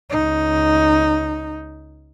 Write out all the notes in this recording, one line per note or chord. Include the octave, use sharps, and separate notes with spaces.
C#2 D#4